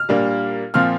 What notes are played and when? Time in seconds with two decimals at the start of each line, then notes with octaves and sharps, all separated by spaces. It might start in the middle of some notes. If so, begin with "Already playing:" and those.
Already playing: F6
0.09 A#2 G3 A#3 D4
0.74 A#2 F3 C4 F6